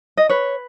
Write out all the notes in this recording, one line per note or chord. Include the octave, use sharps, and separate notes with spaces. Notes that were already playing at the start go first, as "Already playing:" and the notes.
D#5
B4 C#5